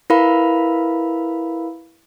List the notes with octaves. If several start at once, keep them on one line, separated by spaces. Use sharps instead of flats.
E4 A#4 B4 F5 B5